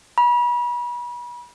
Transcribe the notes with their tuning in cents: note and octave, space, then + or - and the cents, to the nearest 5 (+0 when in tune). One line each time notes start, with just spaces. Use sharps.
B5 -35